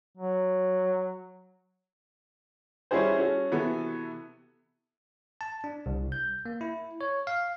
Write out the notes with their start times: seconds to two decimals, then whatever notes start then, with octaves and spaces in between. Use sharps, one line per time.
0.18 F#3
2.91 G3 C#4 E4 F#4 G#4 C5
3.18 C#4 F#4 A4
3.51 C3 E3 B3 F#4 A4
5.41 A5
5.64 D4
5.86 C2
6.12 G6
6.46 A#3
6.61 E4
7.01 C#5
7.27 F5